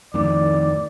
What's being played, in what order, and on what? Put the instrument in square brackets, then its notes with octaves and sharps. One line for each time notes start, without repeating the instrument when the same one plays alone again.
[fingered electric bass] F2 A2 D#3 [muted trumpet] D5